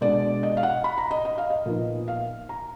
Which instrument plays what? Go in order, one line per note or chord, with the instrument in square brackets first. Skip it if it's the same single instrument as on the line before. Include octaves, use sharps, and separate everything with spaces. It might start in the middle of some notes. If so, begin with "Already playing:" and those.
[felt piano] B2 G#3 D4 D5
D#5
F5
F#5
B5
A#5
D#5
D#5
F5
D#5
A#2 F3 B3 D#4
F5
A#5